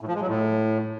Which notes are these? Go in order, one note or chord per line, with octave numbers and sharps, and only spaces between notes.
A2
F3
G#3
F#3
A2